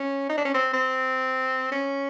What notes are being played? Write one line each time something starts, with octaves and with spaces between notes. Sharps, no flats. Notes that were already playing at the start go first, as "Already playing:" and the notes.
Already playing: C#4
D#4
D4
C#4
C4
C4
C#4